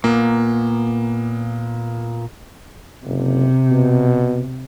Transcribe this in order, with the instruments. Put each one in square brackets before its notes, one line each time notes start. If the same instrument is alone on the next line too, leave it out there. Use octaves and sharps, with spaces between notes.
[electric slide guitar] A#2 B3 [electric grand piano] A#3
[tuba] F#1 [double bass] C3
[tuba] B2